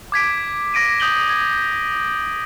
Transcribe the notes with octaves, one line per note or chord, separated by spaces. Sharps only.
D6 G#6 B6 D7
D6 A#6 D7 D#7
D#6 G6 F#7 G7
G#6